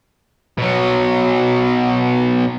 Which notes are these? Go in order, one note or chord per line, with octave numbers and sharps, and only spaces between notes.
B2 F#3